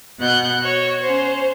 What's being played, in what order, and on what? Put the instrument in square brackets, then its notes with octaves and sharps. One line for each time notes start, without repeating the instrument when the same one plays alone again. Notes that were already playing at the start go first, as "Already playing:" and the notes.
[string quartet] B2 F#5 F#6 G6
F#4 C#5
C#4 C5